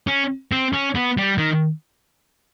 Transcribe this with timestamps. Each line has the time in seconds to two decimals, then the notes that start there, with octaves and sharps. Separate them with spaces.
0.07 C#4
0.52 C4
0.73 C#4
0.95 B3
1.17 G3
1.38 D#3